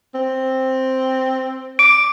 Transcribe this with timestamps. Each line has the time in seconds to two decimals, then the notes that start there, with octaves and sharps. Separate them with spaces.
0.15 C4
1.79 D6 D7